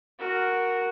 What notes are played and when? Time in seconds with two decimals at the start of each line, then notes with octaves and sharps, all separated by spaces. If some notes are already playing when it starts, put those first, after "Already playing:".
0.19 F#4 A#4